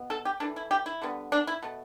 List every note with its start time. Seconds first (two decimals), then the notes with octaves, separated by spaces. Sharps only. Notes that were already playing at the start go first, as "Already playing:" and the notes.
Already playing: B2 B3
0.10 A4
0.25 G4
0.40 E3 A3 D4
0.56 E4
0.71 G4
0.86 E4
1.02 D3 G3 B3
1.32 D4
1.47 E4
1.62 B2 A3